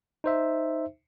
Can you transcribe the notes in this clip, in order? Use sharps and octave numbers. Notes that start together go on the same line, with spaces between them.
D#4 C5 E5